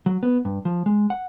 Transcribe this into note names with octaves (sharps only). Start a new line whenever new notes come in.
F#3
B3
G2
F3
G#3
F#5